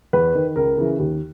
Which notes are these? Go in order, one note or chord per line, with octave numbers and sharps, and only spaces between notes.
E2 B4
D#3
C#2 A#4
C#3 E3
D#2